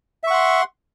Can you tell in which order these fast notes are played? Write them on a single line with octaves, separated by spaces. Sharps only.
E5 C#6 F#5 C6